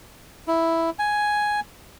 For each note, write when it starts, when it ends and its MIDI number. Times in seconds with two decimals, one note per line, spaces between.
0.47 0.90 64
0.99 1.60 80